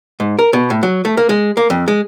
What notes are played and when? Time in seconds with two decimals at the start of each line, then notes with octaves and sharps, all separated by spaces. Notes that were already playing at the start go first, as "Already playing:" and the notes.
0.20 G#2
0.39 A#4
0.53 B2
0.70 A2
0.83 F#3
1.05 A3
1.17 A#3
1.29 G#3
1.57 A#3
1.70 F2
1.88 G#3